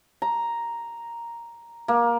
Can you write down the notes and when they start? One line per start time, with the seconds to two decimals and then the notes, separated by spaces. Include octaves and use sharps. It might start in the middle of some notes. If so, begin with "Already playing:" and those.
0.22 A#5
1.88 A#3